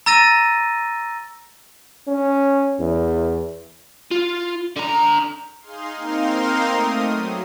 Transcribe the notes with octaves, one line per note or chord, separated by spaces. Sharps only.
A#5 E6 A6 A#6 D#7
C#4
E2
F4
D3 A#5
D#4 G#4 F5 C6
A#3 C4 D#4 A#4 F5 C6
A3 D#6
F#3